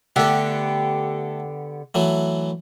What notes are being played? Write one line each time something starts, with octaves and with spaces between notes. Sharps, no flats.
D3 A3 B3 G4 A4
E3 F#3 A3